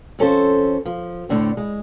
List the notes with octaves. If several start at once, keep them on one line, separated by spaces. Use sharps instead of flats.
F2 C#4 A4 C5
F3
A2 D3 C4
G#3